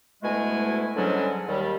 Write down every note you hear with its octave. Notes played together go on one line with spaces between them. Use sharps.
D2 B2 G#3 A3 E4 G#5
G#2 D3 F#3 G3 C#4 D4
D#2 D#3 G3